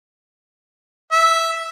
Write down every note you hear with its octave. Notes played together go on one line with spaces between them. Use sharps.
E5